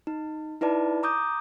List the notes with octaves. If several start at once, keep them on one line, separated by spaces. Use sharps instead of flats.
D#4
D#4 E4 B4 D5 A5
A#5 D6 D#6 G6